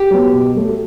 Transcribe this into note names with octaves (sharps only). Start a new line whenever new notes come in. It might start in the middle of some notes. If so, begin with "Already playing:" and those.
Already playing: G4
F#3 B3
B2
F#3 A3